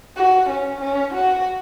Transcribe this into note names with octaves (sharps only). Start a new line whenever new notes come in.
F#4
C#4
C#4
F#4